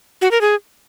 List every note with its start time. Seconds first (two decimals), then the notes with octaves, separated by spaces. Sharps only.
0.21 F#4
0.31 A#4
0.41 G#4